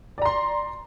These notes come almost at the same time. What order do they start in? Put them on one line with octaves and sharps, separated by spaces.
D5 A#5 C6